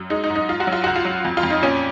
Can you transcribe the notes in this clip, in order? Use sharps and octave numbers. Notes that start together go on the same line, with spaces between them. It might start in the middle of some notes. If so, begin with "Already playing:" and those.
Already playing: F#2
G#3 D#4
D#4
G#2
D#4
G#2 F4
F#4
F#3
F4
C#2 F#4
F4
F#3
F2
F4
F2
D#4
A#2 C#4